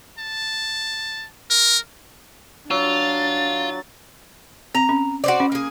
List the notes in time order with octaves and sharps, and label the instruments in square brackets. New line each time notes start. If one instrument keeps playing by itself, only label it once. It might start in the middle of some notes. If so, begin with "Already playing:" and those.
[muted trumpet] A5
A#4
[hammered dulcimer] F#3 [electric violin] D4 A6 [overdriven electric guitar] F4
[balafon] C4 [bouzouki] A#5
[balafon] C#4
[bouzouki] F#4 C5 D5
[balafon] C#4
[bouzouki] A#3 G#4